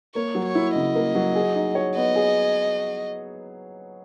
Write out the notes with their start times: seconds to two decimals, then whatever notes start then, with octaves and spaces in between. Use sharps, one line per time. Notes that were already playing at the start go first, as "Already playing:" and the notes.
0.15 A#3 C#5
0.35 F#3
0.45 C#5
0.55 E4
0.75 C#3 D#5
0.95 A#3
1.15 F#3
1.35 G#4
1.55 D#4
1.75 C#5
1.95 B3 D#5
2.16 G#4